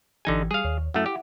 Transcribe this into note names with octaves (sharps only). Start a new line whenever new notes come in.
G#1 D3 E3 D#4 G4 G#5
G3 G#4 F5 C#7
D#2 C#5
F#2 A3 E4 E5 F#5
G4